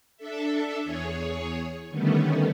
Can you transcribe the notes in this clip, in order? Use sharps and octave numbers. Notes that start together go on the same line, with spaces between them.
D4 A4 E5
E2 G#4 C#5
D3 D#3 G3 A3 B3 C#4